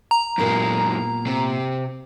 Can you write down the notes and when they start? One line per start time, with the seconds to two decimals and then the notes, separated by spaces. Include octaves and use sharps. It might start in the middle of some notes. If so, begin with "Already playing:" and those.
0.11 A#5
0.38 F#2 A#2 G#3 A#3 B3
1.27 C3